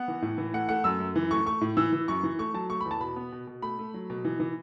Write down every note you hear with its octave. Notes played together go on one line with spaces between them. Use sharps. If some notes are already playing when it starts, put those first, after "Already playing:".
Already playing: B3 F#5
E3
A2
E3
A3 F#5
A3 F#5
F#2 E6
F#2
E3
A3 C#6
A3 C#6
A2
E3 E6
E3
F#2 C#6
E3
A3 C#6
F#3 A5
A3 C#6
B5
E2
A5
B2 B5
B3
B2
B2
A3 B5
A3
F#3
B2
E3
E3